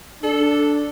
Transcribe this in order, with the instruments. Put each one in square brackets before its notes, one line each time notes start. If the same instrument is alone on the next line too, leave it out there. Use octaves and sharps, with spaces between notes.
[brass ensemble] D4 [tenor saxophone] A4